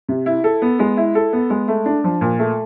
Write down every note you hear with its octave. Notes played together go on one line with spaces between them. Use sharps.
C3
E4
A4
B3
G#3
E4
A4
B3
G#3
A3
D4
F3
A#2
A3